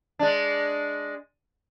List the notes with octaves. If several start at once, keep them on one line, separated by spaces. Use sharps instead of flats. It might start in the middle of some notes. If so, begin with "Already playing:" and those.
G#3 D4